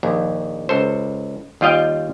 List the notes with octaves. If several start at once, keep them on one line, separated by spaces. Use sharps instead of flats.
A#1 D#2
C#2 A4 C5
D#2 G3 F4 D#5 F5 G5